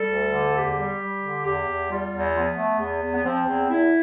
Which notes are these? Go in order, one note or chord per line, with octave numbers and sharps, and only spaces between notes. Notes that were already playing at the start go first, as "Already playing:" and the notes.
Already playing: G3 A4
D2
D3
E2 G4
G3
G3
D3
E2 G4
E2
G3 F4
E2
F3 B3
A3
E2
E2
B3
F3 C4
E2
E2 E4